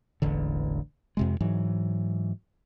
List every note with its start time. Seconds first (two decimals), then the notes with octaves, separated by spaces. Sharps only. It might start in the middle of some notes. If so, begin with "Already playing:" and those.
0.22 E1 A1 D3
1.17 F2 C3 G#3
1.41 G#2 E3 F#3